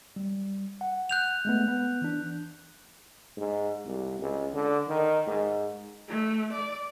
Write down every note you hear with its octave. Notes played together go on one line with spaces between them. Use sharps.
G3
F#5
F#6 G6 F7
G#3 A3 B3
B3
E3 D4
G#2
C2
C#2
D3
D#3
G#2
A3
D5